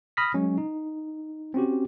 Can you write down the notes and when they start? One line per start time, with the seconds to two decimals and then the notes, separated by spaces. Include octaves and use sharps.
0.17 B5 D#6 F6 A#6 B6
0.34 F#3 G#3 C#4
0.58 D#4
1.54 C4 C#4 F#4 G4